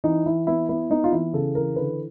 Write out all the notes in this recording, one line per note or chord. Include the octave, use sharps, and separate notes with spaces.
E3 D#4
E3 E4
B3 E4
B3 E4
B3 D#4
F4
E3 E4
C#3 A4
E3 A#4
D3 B4